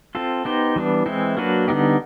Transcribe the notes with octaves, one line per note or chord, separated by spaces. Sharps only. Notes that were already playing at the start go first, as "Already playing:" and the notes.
C4 F4 A4
B3 D#4 G4 C5
E3 G3 B3 D4
E3 G#3 C4 E4
F#3 A#3 D4 F#4 B4
D3 G3 B3 D#4 G4